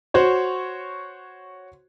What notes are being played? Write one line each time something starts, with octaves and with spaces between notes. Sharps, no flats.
F#4 C5 C#5